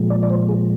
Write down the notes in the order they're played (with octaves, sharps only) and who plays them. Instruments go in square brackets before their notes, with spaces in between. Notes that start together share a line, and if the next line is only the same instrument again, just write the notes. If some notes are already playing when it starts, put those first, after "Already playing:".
Already playing: [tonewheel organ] A#2 F3 G#3
D5
D5
C5
G#4